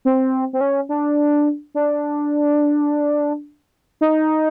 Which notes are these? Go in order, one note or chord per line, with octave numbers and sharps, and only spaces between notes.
C4
C4
C#4
D4
D4
D#4